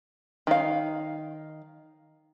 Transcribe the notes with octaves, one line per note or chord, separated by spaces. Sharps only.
D#3 F5